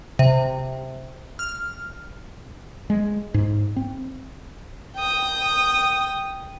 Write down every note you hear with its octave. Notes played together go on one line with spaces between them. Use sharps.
C3
F6
G#3
G#2
C4
G5 D#6